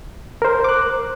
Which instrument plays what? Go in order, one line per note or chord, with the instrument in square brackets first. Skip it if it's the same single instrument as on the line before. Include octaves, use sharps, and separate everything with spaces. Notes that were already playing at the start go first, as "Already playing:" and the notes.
[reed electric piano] A#4 C5
D6 F#6